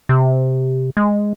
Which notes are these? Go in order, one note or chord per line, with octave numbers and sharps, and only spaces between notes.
C3
G#3